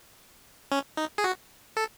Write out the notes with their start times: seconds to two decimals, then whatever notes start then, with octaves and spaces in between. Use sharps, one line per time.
0.72 C#4
0.97 D#4
1.18 G#4
1.24 F#4
1.77 A4